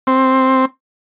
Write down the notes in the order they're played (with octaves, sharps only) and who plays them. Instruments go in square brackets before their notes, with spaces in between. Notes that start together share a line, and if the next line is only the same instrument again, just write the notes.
[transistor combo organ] C4